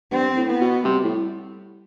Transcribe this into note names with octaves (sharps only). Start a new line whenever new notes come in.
G2 C4
A2
B3
B2
C3 G3
A2